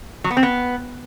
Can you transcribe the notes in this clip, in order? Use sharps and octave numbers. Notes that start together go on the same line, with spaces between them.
F#3
B3
C4
B3